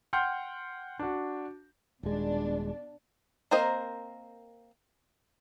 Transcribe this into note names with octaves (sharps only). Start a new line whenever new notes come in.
F#5 G5 C6 F6 G6
D4 F#4
D#1 B2 G#3 D4
A#3 C4 A#4 C5 D#5